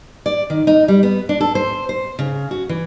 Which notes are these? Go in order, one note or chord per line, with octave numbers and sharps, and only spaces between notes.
D5
D#3
D#4
G3
B3
D4
A4
C5
C5
C#3
F#4
E3